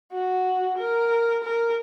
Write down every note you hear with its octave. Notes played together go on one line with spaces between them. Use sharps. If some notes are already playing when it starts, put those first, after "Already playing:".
F#4
A#4
A#4